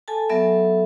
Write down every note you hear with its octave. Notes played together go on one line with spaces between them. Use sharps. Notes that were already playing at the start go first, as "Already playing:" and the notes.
A4 G#5 A5
F#3 B3 A4 E5